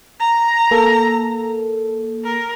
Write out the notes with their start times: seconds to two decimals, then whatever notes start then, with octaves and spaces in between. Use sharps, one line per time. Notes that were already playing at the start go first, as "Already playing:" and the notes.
0.20 A#5
0.71 A#3 A4
2.25 A#4